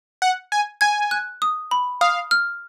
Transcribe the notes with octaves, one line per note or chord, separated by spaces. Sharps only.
F#5
G#5
G#5 G#6
F#6
D#6
B5
F5 D#6
F6